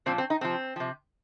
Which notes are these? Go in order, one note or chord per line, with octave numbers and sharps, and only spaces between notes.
A#2 F3 C4
C4
D#4
C3 F3 C4
C3 F3